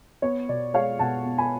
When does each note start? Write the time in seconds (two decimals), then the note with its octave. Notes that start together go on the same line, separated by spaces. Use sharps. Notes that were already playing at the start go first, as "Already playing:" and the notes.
0.22 B3 C#5
0.49 B2 D5
0.74 G#3 C#5 F5
0.99 B2 F#5 A5
1.25 B3
1.38 G#5 B5